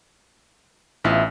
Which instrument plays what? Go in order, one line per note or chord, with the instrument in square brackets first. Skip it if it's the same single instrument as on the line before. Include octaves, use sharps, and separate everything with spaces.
[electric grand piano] A1 [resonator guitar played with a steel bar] B3 E4 F4